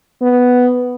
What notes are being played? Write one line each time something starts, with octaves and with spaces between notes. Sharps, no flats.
B3